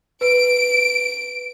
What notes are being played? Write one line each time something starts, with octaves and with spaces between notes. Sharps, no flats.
B4 D7